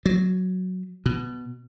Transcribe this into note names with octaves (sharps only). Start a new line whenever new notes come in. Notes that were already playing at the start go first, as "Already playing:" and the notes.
F#3
B2